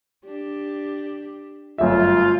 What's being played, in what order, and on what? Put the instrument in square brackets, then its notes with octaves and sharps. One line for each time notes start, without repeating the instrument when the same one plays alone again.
[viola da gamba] D4 G4
[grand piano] G1 F#2 E5 [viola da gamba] A3 [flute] F4